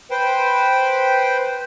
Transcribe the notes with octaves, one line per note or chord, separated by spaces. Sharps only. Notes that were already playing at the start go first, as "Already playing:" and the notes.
B4 C5 G5